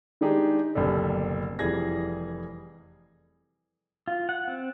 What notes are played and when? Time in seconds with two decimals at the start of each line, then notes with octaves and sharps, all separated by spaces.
0.21 D#3 G#3 D4 D#4 G4 G#4
0.75 F#1 D2 B2 G3 A4
1.59 F1 E3 G3 G#4 G#6 A#6
4.08 F4
4.29 F#5
4.48 C4